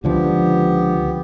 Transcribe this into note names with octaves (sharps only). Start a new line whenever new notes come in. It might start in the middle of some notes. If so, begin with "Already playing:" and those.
C#2 D3 F3 B3 G4